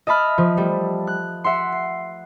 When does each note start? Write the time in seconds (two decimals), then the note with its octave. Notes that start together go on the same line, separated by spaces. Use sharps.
0.07 D#5 E5 A5 B5 F6
0.38 F3
0.57 G3 A3
1.07 F#6
1.44 E5 F#5 C6
1.72 C7